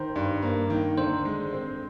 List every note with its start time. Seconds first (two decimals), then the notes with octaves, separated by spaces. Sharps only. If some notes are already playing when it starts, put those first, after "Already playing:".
Already playing: D#3 C5
0.16 G2
0.42 A#3
0.70 D#3
0.97 D3 C5
1.25 G#3
1.53 C4